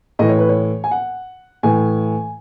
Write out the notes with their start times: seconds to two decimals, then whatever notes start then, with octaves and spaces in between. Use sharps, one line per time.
0.19 A2 E3 D#5
0.29 C#5
0.39 B4
0.49 C#5
0.84 G#5
0.91 F#5
1.63 A2 E3 G#5